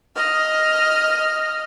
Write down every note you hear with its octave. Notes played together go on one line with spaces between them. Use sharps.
D#5 F6